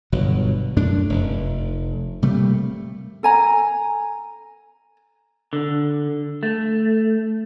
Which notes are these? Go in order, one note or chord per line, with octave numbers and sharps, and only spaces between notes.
G1 B2 F#3
F#2 A3 D4
F1
C3 G3 A3 A#3
A4 G#5 A#5
D3
A3